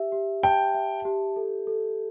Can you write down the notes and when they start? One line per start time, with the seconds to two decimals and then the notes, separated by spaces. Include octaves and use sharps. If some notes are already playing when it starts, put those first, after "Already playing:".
Already playing: G4 E5
0.12 G4
0.43 G5 A5
0.74 E5
1.05 G4
1.36 A4
1.67 A4